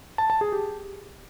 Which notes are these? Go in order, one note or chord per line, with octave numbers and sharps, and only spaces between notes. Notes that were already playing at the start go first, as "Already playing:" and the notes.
A5
A5
G#4
G4